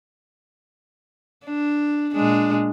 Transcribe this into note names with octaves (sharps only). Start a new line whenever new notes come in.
D4
A#2 G#3 D4